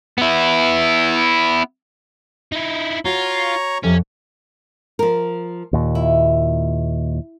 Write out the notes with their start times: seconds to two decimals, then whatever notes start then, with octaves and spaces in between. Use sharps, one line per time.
0.18 B3 E4
2.52 D#4 E4
3.05 F4 F#4 C#5 A#5 C#6
3.84 F2 C3 C#4
4.99 F3 A#4
5.73 D#2 A#2
5.95 E4